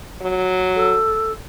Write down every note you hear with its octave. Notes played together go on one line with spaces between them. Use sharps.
F#3
A4